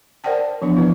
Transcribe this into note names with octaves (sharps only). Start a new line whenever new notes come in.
A#4 C5 D5 F#5 G5 A5
E3 F3 B3 D4
E4 B4